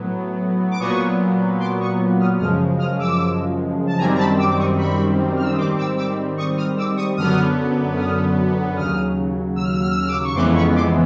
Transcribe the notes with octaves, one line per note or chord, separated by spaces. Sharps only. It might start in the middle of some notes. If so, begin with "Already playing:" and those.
Already playing: A2 F#3 B3
D6
A#2 F#3 B3 C#6 D#6
C6 D6
C#6 D#6
D#6 F6
F#2 C#3 F3 G#3 D#6 F6
D#6 F6
D6 E6
A5
F#2 D#3 G3 C4 G#5 A#5
A#5
A5 B5
D6 E6
D6
C#6 D#6
B5 C#6
F6
E6
D#6
G#2 D#3 G3 C4 C6 D6
D6 E6
D6 E6
C#6 D#6
D#6 F6
D6 E6
C#6 D#6
F#2 D3 F#3 B3 D#6 F6
D#6 F6
D#2 C#3 F#3 D#6 F6
E6
F6
E6
F6
E6
F6
D6 E6
C#6
F2 C#3 E3 G#3 B3 C6 D6
B5 C#6
C6 D6